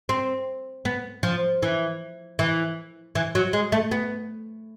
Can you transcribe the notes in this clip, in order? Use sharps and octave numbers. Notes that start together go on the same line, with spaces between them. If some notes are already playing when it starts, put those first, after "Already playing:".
C4
B3
F3
E3
E3
E3
F#3
G#3
A3
B3